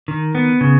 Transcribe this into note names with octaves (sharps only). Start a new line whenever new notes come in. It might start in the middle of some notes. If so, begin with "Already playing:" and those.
D#3
B3
C#3